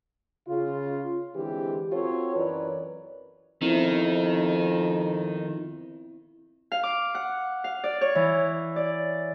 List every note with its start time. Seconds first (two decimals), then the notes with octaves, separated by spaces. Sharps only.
0.48 C#3 F4
1.35 D3 E3 G#3 C4 G4
1.92 C4 F4 F#4 A4 C#5
2.36 F#2 E3 A#4 B4 C#5 D5
3.62 F2 D#3 B3 C4 E4
6.72 F5
6.83 D6
7.15 F#5
7.64 F5
7.84 D5
8.01 C#5
8.15 E3
8.76 D5